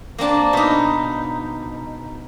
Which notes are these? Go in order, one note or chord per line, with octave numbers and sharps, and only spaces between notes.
A#3 C4 D4 A5
B2 D#4